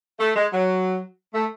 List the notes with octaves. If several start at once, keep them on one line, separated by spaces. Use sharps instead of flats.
A3
G#3
F#3
A3